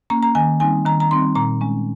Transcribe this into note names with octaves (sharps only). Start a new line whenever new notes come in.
A#3 C#4 A#5
A#5
D#3 G#5
G3 C4 D#4 G#5
D#3 A#5
A#5
G3 C4 D#4 C6
A#2 A#5
G#3 C#4